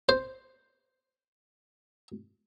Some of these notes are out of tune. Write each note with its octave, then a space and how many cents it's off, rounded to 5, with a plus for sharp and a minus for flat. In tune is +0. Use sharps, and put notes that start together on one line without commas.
C5 +0